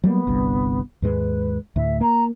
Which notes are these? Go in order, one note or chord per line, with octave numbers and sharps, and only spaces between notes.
F#3 G3 A#3 B3
G1 C2 G2
D#2 G#2 G#3 B4
D2 A2 E5
A#3 A#5